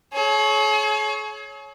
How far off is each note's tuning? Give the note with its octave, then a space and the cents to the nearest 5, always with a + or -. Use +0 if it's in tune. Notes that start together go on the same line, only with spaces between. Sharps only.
G#4 +45 C#5 +0